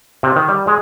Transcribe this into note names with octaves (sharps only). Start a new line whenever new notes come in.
C3
D#3
G3
G#3